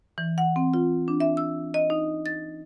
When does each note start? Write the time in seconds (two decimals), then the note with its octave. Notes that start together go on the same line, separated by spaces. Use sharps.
0.18 E3
0.38 F#5
0.56 C4
0.74 F4
1.08 D4
1.20 E5
1.37 E6
1.74 D#5
1.90 D#4
2.26 A6